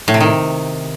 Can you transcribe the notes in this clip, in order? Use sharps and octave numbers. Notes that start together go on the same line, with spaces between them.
A2
C3
D#3